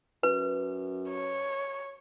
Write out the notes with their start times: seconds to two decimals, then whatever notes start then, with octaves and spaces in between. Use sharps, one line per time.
0.23 F#2 B4
1.09 C#5